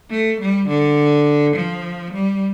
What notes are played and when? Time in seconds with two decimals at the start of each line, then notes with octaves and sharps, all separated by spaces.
0.10 A3
0.40 G3
0.68 D3
1.55 F3
2.13 G3